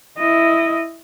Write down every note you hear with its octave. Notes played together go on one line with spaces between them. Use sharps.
E4 D#5